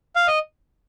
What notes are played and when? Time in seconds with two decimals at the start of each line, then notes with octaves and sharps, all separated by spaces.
0.16 F5
0.27 D#5